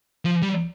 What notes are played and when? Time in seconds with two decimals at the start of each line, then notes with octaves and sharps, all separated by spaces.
0.25 F3
0.42 G3